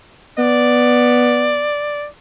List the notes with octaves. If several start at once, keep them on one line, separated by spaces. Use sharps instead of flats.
B3 D5